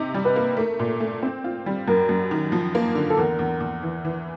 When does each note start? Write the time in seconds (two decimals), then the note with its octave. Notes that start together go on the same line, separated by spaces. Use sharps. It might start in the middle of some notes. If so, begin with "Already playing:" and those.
Already playing: C3 D#4
0.14 G3
0.25 B4
0.36 A#3
0.57 A3 A#4
0.79 A#2
1.00 A3
1.23 C4
1.44 F4
1.66 G3
1.88 F#2 A#4
2.09 F#2
2.31 D#3
2.52 F3
2.75 A#3
2.95 D3
3.10 A4
3.17 E2 A#4
3.39 E2
3.61 E2
3.82 E3
4.05 E3